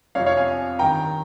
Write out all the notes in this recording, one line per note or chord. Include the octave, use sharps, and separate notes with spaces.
F2 C3 F3 C#5 F5
C#5 F5
F5 G#5
G2 D#3 G5 A#5